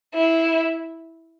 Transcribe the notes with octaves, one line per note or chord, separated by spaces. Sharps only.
E4